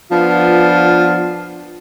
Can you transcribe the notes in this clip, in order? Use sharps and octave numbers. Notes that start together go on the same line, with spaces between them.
F3 B3 D4 F4